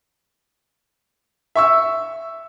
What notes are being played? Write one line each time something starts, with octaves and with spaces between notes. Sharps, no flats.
E5 C#6 E6